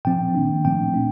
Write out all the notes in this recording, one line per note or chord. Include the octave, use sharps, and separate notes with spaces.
A#2 F3 C4 G5
D#3 A#3 D4
A#2 F3 A3 C4 G5
A3 D4